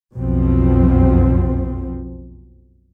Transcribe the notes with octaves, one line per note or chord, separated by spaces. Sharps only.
F#1 B1 F2 B2 F3 C4